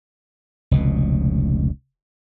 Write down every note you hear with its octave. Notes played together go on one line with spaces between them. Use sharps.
F1 C#2 B2